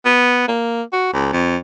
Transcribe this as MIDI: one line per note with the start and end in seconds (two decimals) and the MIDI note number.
0.06 0.45 59
0.48 0.83 58
0.93 1.09 66
1.14 1.29 37
1.33 1.57 41